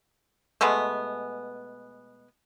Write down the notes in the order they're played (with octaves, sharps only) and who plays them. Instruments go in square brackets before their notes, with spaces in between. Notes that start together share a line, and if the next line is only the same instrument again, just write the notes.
[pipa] B2 G#3 A3 B3